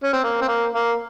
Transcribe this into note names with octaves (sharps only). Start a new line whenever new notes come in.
C#4
C4
A#3
C4
A#3
A#3